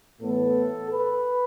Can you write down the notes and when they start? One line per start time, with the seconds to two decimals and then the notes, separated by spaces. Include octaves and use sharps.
0.21 A2 E3 B3 A4
0.91 B4